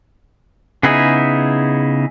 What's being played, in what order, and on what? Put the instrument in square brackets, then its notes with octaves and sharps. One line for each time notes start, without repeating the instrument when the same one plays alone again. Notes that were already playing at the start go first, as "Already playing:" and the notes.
[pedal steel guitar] C#3 B3 D#4 E4 G#4